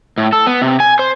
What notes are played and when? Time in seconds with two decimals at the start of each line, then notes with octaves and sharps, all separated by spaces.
0.18 A2
0.33 A4
0.47 B3
0.62 C3
0.80 G#5
0.99 C5